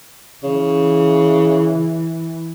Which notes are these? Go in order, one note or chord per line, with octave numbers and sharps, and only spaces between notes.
C#3 E3